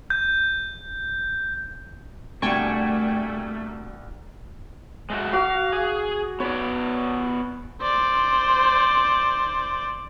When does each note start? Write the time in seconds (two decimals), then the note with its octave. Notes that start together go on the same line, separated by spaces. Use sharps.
0.10 G6
2.42 C2 A3 A#3 D4 F#4 G5 G#5 C#6
5.10 G#3 A3 F#4
5.33 F#4 F5 D6
5.72 G#4
6.40 B3 C#5 D5
7.82 C5 D5